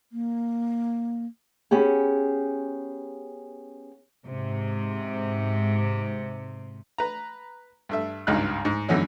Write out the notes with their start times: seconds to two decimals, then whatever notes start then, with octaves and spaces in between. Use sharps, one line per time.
0.12 A#3
1.71 B3 C#4 G4 G#4
4.26 G#2 C3
6.98 B4 A#5
7.89 G2 A3 E5
8.27 G#1 C#2 G2 D#4 F#6
8.65 G#2
8.88 F#2 D3 E3 B3 C#4 D#4